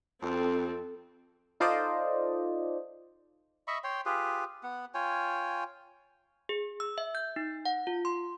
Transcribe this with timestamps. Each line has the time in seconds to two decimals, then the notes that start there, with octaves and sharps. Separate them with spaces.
0.22 F2 C4 A4
1.60 D#4 F4 A4 C5 D5 D#5
3.68 D#5 E5 B5 C#6
3.84 C#5 G5 C6
4.06 F4 G4 G#4 B4
4.63 B3 F#5
4.94 F4 C#5 G5 G#5
6.49 G#4
6.80 E6
6.98 E5
7.15 G6
7.36 D#4
7.65 F#5
7.87 F4
8.05 C6